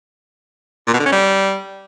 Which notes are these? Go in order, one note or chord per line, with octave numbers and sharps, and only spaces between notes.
A#2
B2
D3
C#4
G3